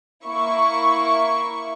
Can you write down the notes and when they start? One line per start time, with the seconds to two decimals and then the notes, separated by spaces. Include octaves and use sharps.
0.25 A#3 E4 C#6